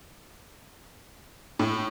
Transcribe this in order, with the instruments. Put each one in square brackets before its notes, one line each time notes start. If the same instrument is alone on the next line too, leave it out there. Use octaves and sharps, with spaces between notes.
[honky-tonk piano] A2